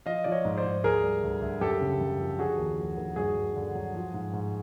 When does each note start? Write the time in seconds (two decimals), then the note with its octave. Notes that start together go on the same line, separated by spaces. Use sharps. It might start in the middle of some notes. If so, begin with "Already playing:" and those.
0.06 F3 D#5 F5
0.24 F3 D5
0.32 C#5 D#5
0.45 G#2
0.57 C5 D5
0.64 G#2
0.84 D2 G#4 A#4
1.03 G3
1.23 D2
1.42 D2
1.61 F#2 G4 A4
1.81 C#3
2.01 F#2
2.19 F3
2.39 D3 F#4 G#4
2.58 D#2
2.77 F3
2.97 D#2
3.16 G2 F#4 G#4
3.36 G2
3.56 D3
3.75 F#3
3.95 F3
4.14 G#2
4.33 G#2